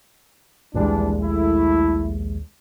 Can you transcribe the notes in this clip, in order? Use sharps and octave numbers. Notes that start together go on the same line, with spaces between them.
A#1 D#2 E3 G3 G#3 D4
A3 E4